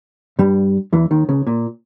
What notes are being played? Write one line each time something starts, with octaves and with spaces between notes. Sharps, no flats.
G2 G3
E2 E3
D#2 D#3
C#2 C#3
A#2